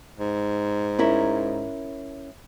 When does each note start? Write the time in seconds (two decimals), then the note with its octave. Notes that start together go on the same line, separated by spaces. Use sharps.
0.19 G#2
0.99 C#4 E4 A#4